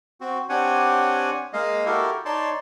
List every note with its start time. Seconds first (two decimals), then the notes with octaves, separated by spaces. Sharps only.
0.21 C4 F#4
0.49 C4 D4 G4 C#5 F#5 G#5
1.53 G#3 A#3 D#5 F5
1.86 E4 F#4 G4 A4 A#4
2.25 D#4 C#5 D5 A5 C6